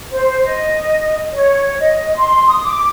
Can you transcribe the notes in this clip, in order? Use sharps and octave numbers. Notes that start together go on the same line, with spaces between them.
C5
D#5
C#5
D#5
C6
D#6
D6